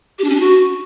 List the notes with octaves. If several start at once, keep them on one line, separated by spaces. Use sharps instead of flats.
G4
D4
C#4
D4
F#4